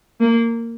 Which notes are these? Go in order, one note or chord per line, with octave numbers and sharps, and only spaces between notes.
A#3